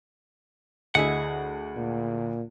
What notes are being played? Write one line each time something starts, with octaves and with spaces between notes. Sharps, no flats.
D2 E4 G#4 D#5 F#5
A#2